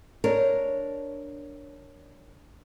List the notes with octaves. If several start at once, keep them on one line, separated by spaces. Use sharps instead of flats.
D4 A#4 C#5